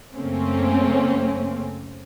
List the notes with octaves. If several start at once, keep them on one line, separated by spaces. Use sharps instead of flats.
F#2 C#3 A3 A#3 C4 C#4